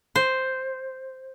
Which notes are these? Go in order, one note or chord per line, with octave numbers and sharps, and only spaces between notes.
C5